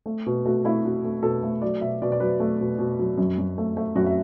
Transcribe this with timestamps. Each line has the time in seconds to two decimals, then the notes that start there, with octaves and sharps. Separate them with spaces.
0.06 A3
0.26 B2
0.45 A3 F#4
0.65 A3 E4
0.85 A3 F#4
1.04 A3
1.23 B2 A4
1.43 A3
1.62 F#3 D5
1.81 B2 E5
2.02 B2 D5
2.12 D5
2.20 F#3 B4
2.40 A3
2.60 B2
2.79 B2
2.99 F#3
3.18 F#2
3.38 F#2
3.58 A3
3.77 A3
3.96 F#2 F#4
4.06 E5